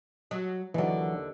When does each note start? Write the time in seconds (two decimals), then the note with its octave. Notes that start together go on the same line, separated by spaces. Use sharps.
0.31 F#3
0.74 D#2 D3 E3 F#3